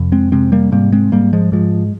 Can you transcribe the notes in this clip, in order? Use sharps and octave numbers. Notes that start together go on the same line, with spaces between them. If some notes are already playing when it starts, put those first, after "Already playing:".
Already playing: F2 C3
G#3 C4
C3 G#3 C4
G3 A#3
G#2 G3 A#3
G#3 C4
G#2 G3 A#3
F3 G#3
G#2 F3 G#3